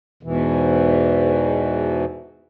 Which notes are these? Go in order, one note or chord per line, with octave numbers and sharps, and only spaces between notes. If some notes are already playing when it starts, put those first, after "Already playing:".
E2 G#2 B2 E3